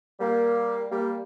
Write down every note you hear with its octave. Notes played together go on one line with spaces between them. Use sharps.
G3 A#3
G3 A#3